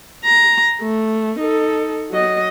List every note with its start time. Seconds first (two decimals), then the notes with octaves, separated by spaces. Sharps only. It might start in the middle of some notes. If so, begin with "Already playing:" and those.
0.25 A#5
0.81 A3
1.39 D#4 A4
2.10 F#3 D#5